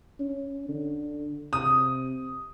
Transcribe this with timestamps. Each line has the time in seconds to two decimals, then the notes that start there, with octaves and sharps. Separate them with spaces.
0.20 C#4
0.69 D3
1.53 C3 D#6